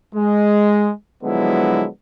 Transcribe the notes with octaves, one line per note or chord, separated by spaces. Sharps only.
G#3
D3 F3 F#3 G#3 B3 E4